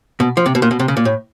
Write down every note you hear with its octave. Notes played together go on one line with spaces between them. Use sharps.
B2
F3
C3
B2
A#2
B2
C3
C#3
A#2
A2